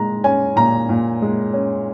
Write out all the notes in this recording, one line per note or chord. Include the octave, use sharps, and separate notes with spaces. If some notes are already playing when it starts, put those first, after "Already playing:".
Already playing: A#2 G#3 A#5
C#4 G#5
A#2 A#5
A#2
G#3
C#4